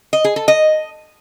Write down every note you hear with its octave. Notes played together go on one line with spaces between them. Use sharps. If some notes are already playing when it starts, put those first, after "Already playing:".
D#5
G#4
A4
D#5